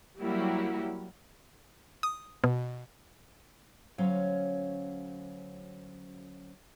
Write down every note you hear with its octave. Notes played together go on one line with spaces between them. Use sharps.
F#3 G3 A#3 E4 F#4 G4
D#6
B2
D2 F#3 C#4 C5 C#5 F5